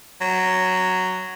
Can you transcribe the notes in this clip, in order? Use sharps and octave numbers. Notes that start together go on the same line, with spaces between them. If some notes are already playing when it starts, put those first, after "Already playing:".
F#3